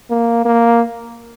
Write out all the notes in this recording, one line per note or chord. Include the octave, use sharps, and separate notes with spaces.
A#3
A#3